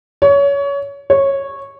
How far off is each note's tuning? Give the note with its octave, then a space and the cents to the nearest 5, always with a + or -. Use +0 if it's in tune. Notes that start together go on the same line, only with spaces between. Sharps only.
C#5 +25
C#5 -10